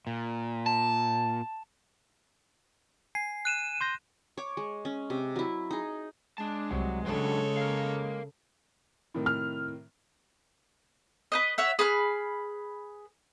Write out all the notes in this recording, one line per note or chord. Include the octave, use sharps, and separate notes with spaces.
A#2
A5
G#5 C7
F#6 D#7 E7
C6 G6 A#6
C#5 D6
G#3
C#4
C3
F#3 E4
D#4 G#4
G#3 D4 A5
C2 F#3
C#3 F#3 D4 A4 C#5
A#4 F5
A2 C3 D#3
F6
B4 C5 D#5
C#5 E5 F#5
G#4 B4 B5 F6